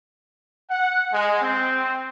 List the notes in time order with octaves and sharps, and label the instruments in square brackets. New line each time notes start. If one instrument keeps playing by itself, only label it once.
[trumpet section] F#5
G#3
C4